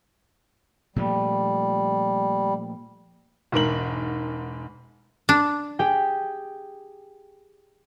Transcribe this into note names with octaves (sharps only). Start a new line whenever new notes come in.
A#2 F3 G3 A3
E1 G#2 A#4 F#7
D4
G4 G#4 G5